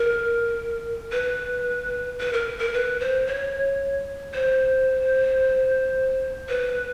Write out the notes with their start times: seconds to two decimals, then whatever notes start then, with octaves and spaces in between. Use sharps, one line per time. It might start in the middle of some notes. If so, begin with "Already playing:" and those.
Already playing: A#4
1.12 B4
2.20 B4
2.33 A#4
2.60 A#4
2.73 B4
3.00 C5
3.27 C#5
4.34 C5
6.49 B4